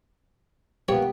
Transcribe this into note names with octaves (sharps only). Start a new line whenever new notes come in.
A#3 B3 G4 C#5